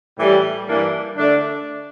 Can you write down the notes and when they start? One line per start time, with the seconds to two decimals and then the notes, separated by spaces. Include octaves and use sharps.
0.18 A2 E3 G3
0.67 G2 E3 G3 A#3 D4
1.16 D3 A3 D4